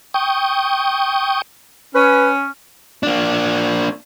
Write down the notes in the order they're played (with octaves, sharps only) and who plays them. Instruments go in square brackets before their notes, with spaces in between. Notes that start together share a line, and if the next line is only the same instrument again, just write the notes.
[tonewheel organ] G5 C#6 D#6
[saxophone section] C#4 [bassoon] B4
[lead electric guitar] A#3 D4